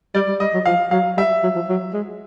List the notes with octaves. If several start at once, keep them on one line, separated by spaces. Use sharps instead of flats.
G3 D5
G3
G3 D#5
F#3
F3 F5
F#3 F5
G3 E5
F#3
F3
F#3
G#3